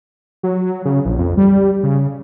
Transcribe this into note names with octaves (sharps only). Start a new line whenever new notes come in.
F#3
C#3
A#1
F2
G3
C#3